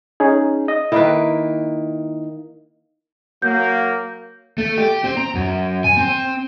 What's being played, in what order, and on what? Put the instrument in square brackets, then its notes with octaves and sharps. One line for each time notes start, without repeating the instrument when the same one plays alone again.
[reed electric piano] C#4 D#4 G#4
D#5
[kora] D#3 A#3 B4 [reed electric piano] E4
[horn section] F#3 A#3 [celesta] G6
[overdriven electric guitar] A3
G4
C4
A#5
F#2
G#5
C4